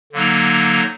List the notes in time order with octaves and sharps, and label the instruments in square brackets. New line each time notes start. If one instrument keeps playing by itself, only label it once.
[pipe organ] D3 F#3 A#3 D#4